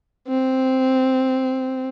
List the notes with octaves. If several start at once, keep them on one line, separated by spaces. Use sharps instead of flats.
C4